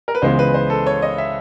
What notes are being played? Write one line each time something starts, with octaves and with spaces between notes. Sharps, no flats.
A#4
B4
C#2 C#3 E3 G#3 B3 C5
B4
C5
A4
C#5
D#5
E5